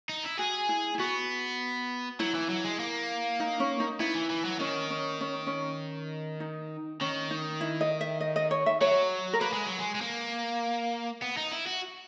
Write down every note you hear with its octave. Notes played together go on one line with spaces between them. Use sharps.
D#4
E4
F#4 G#4
E4
E4
B3 F#4
F#3 E4
E3
F#3
G#3
A#3
D#4
C#4
D#4
B3 E4
E3
E3
F#3
D#3 C#4
C#4
C#4
C#4
D#4
D#3 C#4
D#4
E4
D#5
E5
D#5
D#5
C#5
E5
F#3 C#5
A#4
A#3 B4
G#3
F#3
G#3
G#3
A#3
B3
D#4
E4
F#4